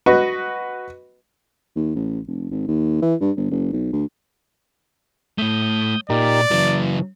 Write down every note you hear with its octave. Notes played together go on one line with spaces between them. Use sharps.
F#4 B4 D#5 C#6
D#2
A1
F1
G#1
D#2
E3
G2
G1
F#1
B1
D2
A2 A3 D#6 G6
A#2 D#4 G4 A#4 D5
C#3 E3 F#3